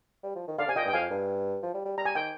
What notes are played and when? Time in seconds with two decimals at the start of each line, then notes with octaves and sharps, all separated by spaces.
0.23 G3
0.36 F3
0.48 D#3
0.58 D3 D5 F5
0.67 C3 G#5
0.75 A#2 D#5 G5
0.85 G2
0.88 G5
0.93 F2 F5 G#5
1.10 G2
1.63 F3
1.74 G3
1.85 G3
1.98 G3 A#5
2.05 G#5
2.15 D#3 G5